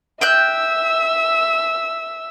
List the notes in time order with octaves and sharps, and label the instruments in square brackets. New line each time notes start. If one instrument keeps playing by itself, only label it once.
[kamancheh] E5 E6 [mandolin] G5 F#6 G6